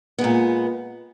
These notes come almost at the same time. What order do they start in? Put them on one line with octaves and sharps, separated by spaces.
B3 G#3 A#2